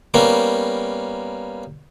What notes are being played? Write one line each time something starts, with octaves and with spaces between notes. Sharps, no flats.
G3 A#3 B3 C#4